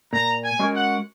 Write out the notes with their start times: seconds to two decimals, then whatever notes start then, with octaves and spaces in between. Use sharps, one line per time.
0.13 A#2 A#5
0.44 G#5
0.59 G#3 C#4 F#4 A#4
0.74 F#5